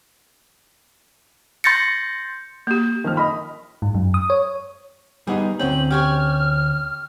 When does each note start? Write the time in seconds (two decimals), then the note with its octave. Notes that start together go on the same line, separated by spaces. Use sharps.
1.64 C6 G6 A6 A#6 C#7
2.67 A#3 G4
3.04 D#3 F3 F6
3.17 D#5 B5
3.82 G#2
3.95 F#2
4.14 D#6
4.30 C#5
5.27 G3 B3 D#4 G#4
5.59 D2 C4 C#4 G5 F#7
5.91 G4 C#5 G#5 F6